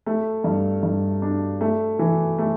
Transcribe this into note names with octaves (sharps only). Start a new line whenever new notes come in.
A3
G2
G2
D4
A3
E3
A3